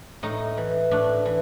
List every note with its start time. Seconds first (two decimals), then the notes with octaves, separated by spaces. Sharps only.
0.23 A2 D#4
0.57 E3
0.91 A2 D4
1.26 E3